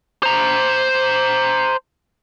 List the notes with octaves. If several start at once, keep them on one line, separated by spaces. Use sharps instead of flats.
C5 A#5